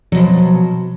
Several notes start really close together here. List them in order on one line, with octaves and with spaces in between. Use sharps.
F#3 B2 F3